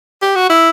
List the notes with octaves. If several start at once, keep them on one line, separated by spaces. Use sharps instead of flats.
G4
F#4
E4